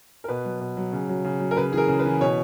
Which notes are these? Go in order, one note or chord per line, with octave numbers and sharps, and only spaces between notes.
A#4
B2 B4
F#3
B2
F#3
C#3
F#3
C#3
F#3
A#4
C#3 B4
E3 G#4
A#4
C#3
B4
E3
B2 C#5